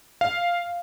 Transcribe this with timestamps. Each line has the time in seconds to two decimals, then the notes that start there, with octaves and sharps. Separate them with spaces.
0.21 F5